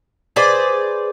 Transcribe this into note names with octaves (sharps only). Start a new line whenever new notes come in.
G#4 B4 C5 D5